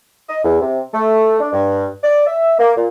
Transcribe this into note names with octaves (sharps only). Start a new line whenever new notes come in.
D#5
E2
C3
A3
D4
G2
D5
E5
A#3
A#2